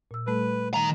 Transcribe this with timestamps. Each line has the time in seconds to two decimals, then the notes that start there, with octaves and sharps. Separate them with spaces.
0.11 A#2 E6
0.27 G3 A3 A4 B4
0.74 D#3 A#5